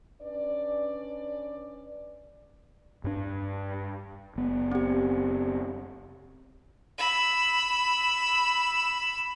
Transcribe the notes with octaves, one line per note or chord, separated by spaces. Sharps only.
C#4 D4 B4 D5
G2 D4
F#1 B3
C4 G4
B5 E6